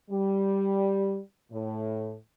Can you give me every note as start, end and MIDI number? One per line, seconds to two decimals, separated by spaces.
0.10 1.18 55
1.51 2.13 45